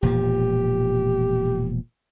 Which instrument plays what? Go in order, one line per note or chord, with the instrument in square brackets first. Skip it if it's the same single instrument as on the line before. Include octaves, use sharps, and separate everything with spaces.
[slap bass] E1 A#2 F3 [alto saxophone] G4